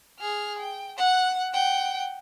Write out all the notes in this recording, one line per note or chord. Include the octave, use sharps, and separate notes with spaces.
G#4 F6
G5
F#5 F#6
F#5 G5